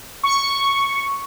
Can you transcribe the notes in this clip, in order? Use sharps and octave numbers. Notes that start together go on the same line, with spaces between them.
C#6